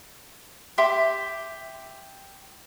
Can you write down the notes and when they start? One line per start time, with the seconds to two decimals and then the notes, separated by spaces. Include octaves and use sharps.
0.78 G4 E5 C6 D6